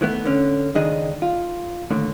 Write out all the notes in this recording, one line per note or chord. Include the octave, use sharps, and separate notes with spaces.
D#3 E3 A3 B3
D3 C#4
C#2 G#2 D#3 D4 G#4 D#5
F4
D#2 A2 D3